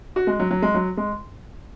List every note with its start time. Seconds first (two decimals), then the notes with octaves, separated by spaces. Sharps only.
0.16 F#4
0.27 G#3
0.40 F#3
0.51 F#3
0.62 G#3
0.74 F#3
0.97 G#3